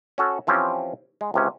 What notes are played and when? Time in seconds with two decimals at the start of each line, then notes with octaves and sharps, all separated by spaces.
0.18 C#4 F#4 A4
0.47 E3 F3 C4 C#4 G4
1.21 G#3
1.34 C#2 C3 C#4